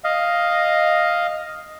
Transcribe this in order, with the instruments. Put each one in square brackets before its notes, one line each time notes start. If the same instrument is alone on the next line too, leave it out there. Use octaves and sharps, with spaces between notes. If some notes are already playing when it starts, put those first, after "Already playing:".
[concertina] D#5 F5